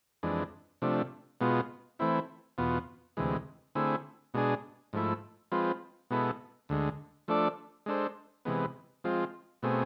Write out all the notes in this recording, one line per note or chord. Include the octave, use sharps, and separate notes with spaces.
F2 E3 G#3 D4
C3 F3 A3 D4
B2 G#3 B3 F4
E3 A3 C4 E4
E2 B2 B3 F4
D2 C3 E3 G#3
D3 A3 C4 E4 G#4
B2 G#3 D4 G#4
G#2 F3 A3 E4
F3 G#3 C4 F4 B4
B2 G#3 B3 E4 A4
D2 D3 G#3
F3 A3 D4 A4 D5
G#3 D4 A4 C5
C3 E3 G#3 B3
F3 G#3 C4 F4
B2 A3 C4 G#4